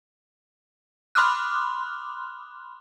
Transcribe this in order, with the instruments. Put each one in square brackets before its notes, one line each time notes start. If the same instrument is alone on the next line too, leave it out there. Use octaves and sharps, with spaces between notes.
[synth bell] B5 C6 D6 D#6 F6 F#6